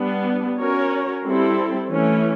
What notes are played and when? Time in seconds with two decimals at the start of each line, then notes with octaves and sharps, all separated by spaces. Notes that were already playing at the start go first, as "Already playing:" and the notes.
Already playing: G3 B3 D4
0.58 C#4 F#4 A#4 C#5
1.23 G3 C4 E4 A4
1.89 E3 A3 C#4